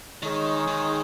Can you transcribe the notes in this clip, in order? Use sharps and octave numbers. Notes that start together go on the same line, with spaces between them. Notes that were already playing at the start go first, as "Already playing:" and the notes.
D#3 G#3 D#4 G#4 C#5
D#3